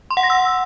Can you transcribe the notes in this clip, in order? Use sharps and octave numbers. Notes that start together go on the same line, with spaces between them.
C6
F#5
A#6
E6